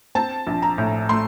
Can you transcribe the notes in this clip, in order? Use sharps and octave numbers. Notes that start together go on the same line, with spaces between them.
C4 A5
A#1
A#5
A2
A3 C6